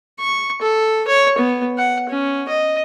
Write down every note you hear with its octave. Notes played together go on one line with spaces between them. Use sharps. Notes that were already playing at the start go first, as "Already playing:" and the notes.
C#6
A4
C#5
B3
F#5
C#4
D#5